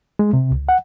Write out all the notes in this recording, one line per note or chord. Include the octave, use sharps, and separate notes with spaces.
G#3
C3
C#2
F#5